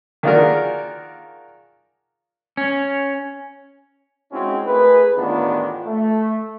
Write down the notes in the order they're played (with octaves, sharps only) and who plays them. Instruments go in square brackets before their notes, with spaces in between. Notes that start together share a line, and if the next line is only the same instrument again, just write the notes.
[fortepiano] D#3 D4 F4 F#4 G#4 A#4
[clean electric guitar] C#4
[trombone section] G#3 C4 C#4 D#4 E4 F#4
A3 G#4 A#4 B4
A1 D#3 B3 D4 F4
A3